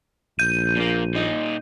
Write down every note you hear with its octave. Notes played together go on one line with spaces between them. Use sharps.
A#1 G6 D#7
A#2 A#3
A#2 D#4